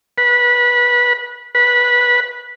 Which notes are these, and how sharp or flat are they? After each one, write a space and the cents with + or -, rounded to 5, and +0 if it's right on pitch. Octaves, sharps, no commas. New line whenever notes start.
B4 -20
B4 -15